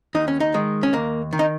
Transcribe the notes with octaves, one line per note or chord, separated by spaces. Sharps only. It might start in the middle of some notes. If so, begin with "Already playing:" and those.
D#2 D#4
C#4
D#4
D#3 G#3
C#4
D#2 A#3
D#3
D#4